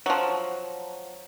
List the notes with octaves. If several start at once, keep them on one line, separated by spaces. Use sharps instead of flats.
F3 F#3